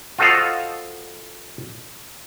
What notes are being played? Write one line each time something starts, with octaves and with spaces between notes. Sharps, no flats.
F4 F#4 A4 C5 D#5 F5